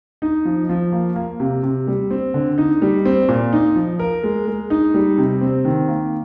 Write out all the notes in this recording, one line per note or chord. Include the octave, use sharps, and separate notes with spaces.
D#4
F3
F3
A#3
A#3
C3
C3
G3
C4
D3
D#4
G3
C4
A#2
D#4
F3
A#4
G#3
G#3
D#4
G3
C3
C4
D#3
A#3